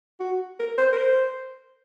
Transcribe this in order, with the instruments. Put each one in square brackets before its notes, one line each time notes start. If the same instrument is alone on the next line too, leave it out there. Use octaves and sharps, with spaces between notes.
[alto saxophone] F#4
A#4
C5
A#4
C5